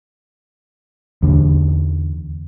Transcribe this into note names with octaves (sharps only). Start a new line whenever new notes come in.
E2 D3